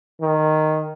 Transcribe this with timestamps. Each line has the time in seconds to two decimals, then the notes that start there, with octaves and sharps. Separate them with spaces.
0.21 D#3